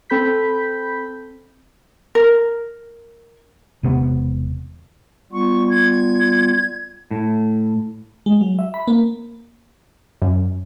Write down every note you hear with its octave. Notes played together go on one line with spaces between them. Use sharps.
C4 A4 B5 G6 B6
A#4
E1 C3 B3
G3 B3 F4 C#6
G#6
A2
G#3
F#3
E5
B5
A#3
F#2